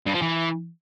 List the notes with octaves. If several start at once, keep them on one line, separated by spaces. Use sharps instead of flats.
G2
F3
E3